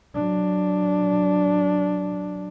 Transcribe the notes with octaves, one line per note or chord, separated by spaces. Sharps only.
F#3 D4